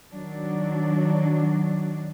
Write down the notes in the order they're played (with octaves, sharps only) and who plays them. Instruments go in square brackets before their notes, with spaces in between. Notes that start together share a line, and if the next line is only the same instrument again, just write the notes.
[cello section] D#3 F#3 D4